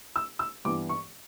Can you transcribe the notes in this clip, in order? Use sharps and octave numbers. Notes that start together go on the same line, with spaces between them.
E6
E6
G2 E3 B3 D6
C#6